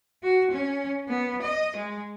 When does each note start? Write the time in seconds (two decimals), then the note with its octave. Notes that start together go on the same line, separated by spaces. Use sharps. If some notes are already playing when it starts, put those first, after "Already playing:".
0.23 F#4
0.51 C#4
1.08 B3
1.42 D#5
1.76 G#3